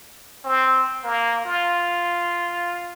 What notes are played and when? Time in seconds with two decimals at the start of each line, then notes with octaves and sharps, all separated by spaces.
0.44 C4
1.04 A#3
1.45 F4